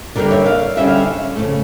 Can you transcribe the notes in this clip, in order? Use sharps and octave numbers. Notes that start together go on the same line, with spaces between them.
D3 G3 A#3 A#4 D5
C#5 E5
D5 F5
D3 G3 C#4 E5
F5
C#5 E5
C#3 F3 A3